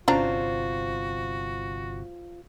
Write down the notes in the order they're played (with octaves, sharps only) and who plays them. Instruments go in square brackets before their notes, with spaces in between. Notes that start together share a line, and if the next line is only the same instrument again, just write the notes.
[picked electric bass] G1 C3 [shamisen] C#4 D4 A#5 [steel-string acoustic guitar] F4 C5 [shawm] F#4